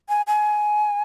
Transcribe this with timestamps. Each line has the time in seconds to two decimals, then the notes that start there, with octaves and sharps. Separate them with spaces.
0.09 G#5
0.27 G#5